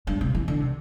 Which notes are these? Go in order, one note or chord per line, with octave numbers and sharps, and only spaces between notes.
G2
C3
E3
D3
C3